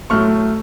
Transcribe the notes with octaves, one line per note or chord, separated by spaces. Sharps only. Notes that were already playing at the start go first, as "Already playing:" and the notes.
A2 F#3 A3 C#6 F6